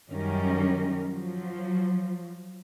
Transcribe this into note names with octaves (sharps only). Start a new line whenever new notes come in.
F#2 D#3 G3 C#4 A#4
F3 F#3